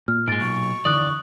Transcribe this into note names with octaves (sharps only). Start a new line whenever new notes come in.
A#2 F6
G#2 G#3 A6 D7
B1 C#6
F#1 D#2 D3 E3 D5 D#6 F#6